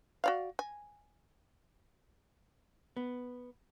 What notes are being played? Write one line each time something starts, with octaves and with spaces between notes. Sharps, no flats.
F#4 D5 F5
G#5
B3